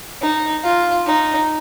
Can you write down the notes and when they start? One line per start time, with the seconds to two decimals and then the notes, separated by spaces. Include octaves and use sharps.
0.21 D#4
0.64 F4
1.06 D#4